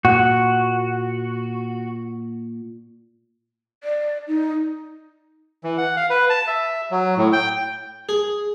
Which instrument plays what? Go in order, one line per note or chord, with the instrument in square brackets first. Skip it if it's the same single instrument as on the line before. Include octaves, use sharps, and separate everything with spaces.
[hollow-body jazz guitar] A#2 [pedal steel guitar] F#4
[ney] D5
D#4
[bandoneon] E3
F#5
F5
B4
A5
E5
F#3
A2
G5
[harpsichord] G#4